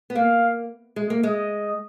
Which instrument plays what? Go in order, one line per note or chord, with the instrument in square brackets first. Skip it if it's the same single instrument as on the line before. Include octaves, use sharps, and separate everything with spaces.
[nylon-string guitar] B3
[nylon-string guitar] A#3 [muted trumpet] F5
[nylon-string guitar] G#3
A#3
[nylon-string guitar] G#3 [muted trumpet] D#5